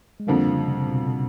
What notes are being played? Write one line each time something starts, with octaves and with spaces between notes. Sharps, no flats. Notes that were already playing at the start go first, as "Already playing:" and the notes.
G#3
F2 D3 F3 G3 A#3
C#3
C3
B2